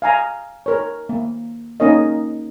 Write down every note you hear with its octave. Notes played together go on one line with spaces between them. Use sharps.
F5 G#5 A#5
A#4 C#5
A#3
A#3 C#4 D#4 A#4 C#5 D#5